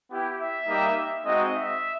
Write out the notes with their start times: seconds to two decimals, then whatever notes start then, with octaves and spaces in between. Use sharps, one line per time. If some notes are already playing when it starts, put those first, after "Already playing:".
0.10 B3 E4 G4
0.39 E5
0.67 G3 A#3 D#4 G4
1.24 G#3 C4 D#4 F#4 D#5
1.53 E5